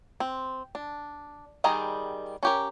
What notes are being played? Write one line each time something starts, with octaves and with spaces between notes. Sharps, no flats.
C4
D4
D#3 G3 G#4 D#5 A#5
C#4 G4 A#4